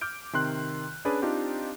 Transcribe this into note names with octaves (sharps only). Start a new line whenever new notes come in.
D6 F6 G6 D7
C3 D#3 C6 F#6
C#4 D4 G#4 B4 D5
C4 D4 D#4 F4 G4